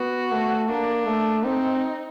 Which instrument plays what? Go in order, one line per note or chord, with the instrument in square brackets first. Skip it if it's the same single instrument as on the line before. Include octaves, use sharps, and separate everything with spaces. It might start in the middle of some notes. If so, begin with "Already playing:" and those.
Already playing: [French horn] B3 [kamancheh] F#4
[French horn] A3
[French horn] A#3 [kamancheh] D4
[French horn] A3
[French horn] C4 [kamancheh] D#4